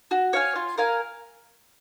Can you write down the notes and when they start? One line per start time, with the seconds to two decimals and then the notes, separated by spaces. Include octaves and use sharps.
0.11 F#4
0.33 C#5 F5 G#5
0.56 F4
0.78 A#4 F5 G#5